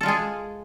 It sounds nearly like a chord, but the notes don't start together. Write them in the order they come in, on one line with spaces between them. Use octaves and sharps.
A4 F4 G#3 G#4